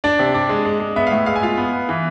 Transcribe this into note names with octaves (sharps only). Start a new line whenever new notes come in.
D4 D5
C3
D4
G#3
G#3
G#3
B3 E5
F5
A2 E5
G#3 F5
G#5
F4 F5
B3
B3
E3